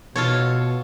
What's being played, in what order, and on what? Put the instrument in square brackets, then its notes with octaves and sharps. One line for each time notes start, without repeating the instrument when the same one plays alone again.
[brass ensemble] B2 [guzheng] F4 A4 C#5